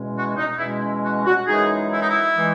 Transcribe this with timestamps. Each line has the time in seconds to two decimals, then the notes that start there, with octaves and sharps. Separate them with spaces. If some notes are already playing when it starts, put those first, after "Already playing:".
Already playing: E2 B2 G#3 C#4
0.16 F#4
0.37 D#4
0.59 E2 B2 G#3 C#4 E4
1.04 F#4
1.26 F#4
1.48 F#2 E3 G#3 D#4 G#4
1.92 E4
2.01 D#4
2.09 E4
2.36 E3 G#3 D#4